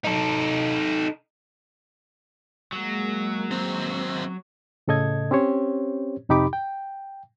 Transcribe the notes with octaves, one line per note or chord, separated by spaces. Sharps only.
D#4 A4
F#3 G#3 A#3
D#2 C4
A2 C#3 A4 D#5 G#6
C4 C#4 G4 C5 C#5
F2 C3 D#4 G4 B5 D6
G5